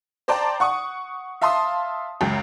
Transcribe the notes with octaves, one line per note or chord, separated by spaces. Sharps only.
C5 D5 G5 A5 A#5
F#5 C#6 D#6
E5 F5 A5 C6 D#6
C#2 F#2 G5